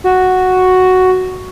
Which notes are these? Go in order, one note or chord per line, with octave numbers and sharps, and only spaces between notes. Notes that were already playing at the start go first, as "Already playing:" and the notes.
F#4